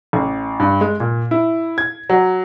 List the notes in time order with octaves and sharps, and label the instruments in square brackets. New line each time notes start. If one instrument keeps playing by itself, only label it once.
[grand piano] A1
G2
G#3
A#2
E4
G#6
F#3